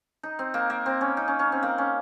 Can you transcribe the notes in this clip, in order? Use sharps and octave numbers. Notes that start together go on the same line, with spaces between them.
D#4
C4
A#3
A#3
C4
C#4
D#4
C#4
C#4
C4
A#3
C#4